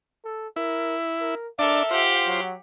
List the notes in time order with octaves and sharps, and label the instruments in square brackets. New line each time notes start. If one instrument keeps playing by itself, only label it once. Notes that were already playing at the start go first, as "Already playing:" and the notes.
[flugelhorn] A4
[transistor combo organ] E4 [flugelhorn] A#4
[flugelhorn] A#4
[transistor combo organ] D4 D5 [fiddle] A4 A#4 [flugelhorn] E5
[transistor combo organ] F4 C5 [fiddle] G4 F#5
[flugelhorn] F#3